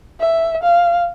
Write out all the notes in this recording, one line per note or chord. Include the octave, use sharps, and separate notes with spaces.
E5
F5